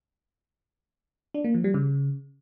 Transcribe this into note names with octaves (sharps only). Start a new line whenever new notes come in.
D4
A#3
F3
G3
C#3